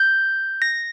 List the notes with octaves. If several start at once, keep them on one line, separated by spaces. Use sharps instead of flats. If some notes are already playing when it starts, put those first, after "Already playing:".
Already playing: G6
A#6